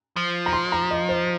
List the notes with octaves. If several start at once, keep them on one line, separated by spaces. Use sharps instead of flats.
F3
A#5
C6
A#5
D#5
C5